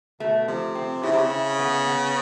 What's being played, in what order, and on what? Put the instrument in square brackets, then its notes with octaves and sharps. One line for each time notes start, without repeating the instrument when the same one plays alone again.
[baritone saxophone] B2 [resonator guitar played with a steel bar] A3
[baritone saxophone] C3 [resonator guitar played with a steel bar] F3
[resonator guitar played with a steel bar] C4
[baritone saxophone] C#3 [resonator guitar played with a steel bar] E4
[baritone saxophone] C3
C#3
[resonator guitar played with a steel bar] E4
B3
B3